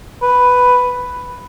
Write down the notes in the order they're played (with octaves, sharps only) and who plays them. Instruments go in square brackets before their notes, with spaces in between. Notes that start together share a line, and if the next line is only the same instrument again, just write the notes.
[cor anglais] B4